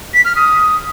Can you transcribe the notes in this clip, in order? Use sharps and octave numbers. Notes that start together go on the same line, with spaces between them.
B6
F6
D#6